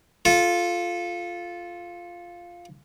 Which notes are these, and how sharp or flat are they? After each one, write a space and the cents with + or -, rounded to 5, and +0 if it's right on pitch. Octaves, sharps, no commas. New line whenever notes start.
F4 +0 A4 -15